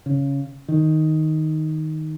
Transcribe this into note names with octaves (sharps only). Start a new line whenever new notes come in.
C#3
D#3